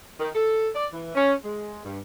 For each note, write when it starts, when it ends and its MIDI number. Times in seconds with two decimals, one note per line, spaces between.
0.20 0.29 51
0.35 0.68 69
0.74 0.87 74
0.92 1.12 52
1.15 1.33 61
1.44 1.85 56
1.85 1.99 43